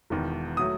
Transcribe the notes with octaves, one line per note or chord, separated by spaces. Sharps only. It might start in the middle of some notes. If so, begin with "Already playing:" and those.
E1 E2 D#3
F#3 A3 D#6